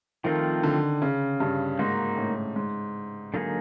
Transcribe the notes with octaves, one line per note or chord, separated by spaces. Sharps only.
D#3 F3 A3 C4 F4 A4
D3
C#3
G2
G#2 A#3 D#4 F#4
A2
G#2
D3 F#3 A#3 D#4 G#4